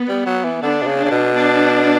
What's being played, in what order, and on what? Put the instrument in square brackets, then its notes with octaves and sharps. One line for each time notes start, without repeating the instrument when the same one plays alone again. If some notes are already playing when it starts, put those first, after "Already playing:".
Already playing: [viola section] B3
[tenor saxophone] G3
F#3
E3
[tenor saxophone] D3 [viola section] B3 D4
[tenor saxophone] B2
C#3
[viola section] B3 D4
[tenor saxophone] C#3
B2
[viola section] B3 D4